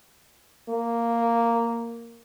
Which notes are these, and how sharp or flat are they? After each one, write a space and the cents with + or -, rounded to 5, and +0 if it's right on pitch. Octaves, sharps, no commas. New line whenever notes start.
A#3 -5